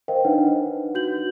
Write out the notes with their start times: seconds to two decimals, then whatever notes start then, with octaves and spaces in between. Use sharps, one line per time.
0.08 A#4 C5 D#5 F5 G5
0.25 D4 D#4 B4 C#5 F#5
0.95 F#4 G6 F#7